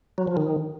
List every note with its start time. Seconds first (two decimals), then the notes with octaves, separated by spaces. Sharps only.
0.18 F#3
0.27 F3
0.37 D#3